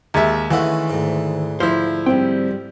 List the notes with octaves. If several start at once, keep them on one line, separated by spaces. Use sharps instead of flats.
D#2 G#3 E5
D#3 E3 G#3 A3 C#4 F5 F#5
D2 G#2
F3 E4 C5
G3 C4 G5